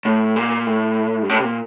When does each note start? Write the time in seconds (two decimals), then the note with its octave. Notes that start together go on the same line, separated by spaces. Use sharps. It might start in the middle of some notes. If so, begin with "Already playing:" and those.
0.05 A2
0.36 A#2
0.66 A2
1.22 G2
1.29 A2
1.40 C3
1.44 A#2